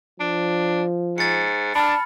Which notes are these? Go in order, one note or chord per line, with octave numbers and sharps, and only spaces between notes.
F3 D4
G#2 A6 C#7
D4 A5 B5 F6